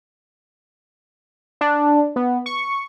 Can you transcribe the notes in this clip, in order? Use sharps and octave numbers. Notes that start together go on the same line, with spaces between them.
D4
B3
C#6